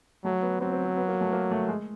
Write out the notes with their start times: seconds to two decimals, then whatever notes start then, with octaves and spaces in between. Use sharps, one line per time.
0.24 F#3 A3
0.42 B3
0.60 F#3 C4
0.72 C4
0.85 C4
0.97 B3
1.08 A#3
1.21 A3
1.33 A#3
1.51 A3
1.69 G#3